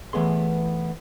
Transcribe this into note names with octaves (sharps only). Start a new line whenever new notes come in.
E3 A3 B3 G#4 C6